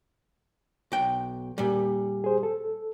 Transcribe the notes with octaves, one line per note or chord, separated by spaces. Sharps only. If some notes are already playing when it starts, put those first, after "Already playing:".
B1 G5
A#2 G3
G#4 C5
A4